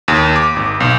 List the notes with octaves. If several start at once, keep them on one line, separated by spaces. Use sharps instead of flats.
D#2
D6
G#1
B1